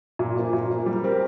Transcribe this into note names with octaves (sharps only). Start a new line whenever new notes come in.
A#2
F3 A#3
A#2
F3 A#3
G3
C4 G4 A#4